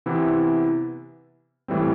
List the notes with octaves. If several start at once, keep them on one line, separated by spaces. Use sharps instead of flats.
C3 E3 B3 E4
A2 E3 G3 C4